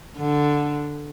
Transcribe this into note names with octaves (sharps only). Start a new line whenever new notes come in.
D3